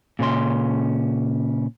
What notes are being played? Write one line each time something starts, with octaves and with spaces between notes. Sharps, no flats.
A#2 C#3 C#4 C6